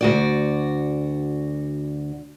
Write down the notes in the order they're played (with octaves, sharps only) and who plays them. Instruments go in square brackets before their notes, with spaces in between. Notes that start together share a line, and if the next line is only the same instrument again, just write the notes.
[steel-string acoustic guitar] D2 F#4 D5